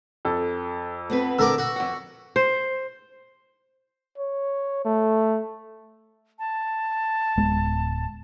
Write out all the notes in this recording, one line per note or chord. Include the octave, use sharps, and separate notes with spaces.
F2 A4
B3 C4 B4
D3 A#4 D6 E6
F#4
F2 F#5
C5
C#5
A3
A5
D1 G#3 B3